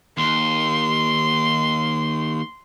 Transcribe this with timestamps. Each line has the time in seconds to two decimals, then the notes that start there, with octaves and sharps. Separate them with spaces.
0.17 D#2 C6